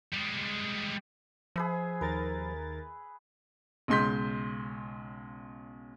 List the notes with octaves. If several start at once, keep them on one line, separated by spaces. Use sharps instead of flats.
G3 G#3
F3 G#4 B4 E5
D#2 A#4 B4 A6
B1 C#3 G#3 C6 G6 B6